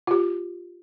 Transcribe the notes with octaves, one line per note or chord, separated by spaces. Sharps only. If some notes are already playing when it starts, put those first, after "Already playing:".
F4 G4